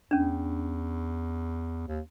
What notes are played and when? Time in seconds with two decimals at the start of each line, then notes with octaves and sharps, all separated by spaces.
0.11 E2 C#4 D4
1.88 D#2